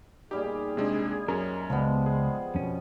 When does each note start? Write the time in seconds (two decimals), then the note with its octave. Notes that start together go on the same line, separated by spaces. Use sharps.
0.31 A#2 G3 D#4 G4 G#4
0.77 C3 G#3 D4
1.28 F#2 C#4 A#4
1.70 C#2 F3 G3 G#3 B3
2.06 G#3 G#4
2.55 F2 B2 C#4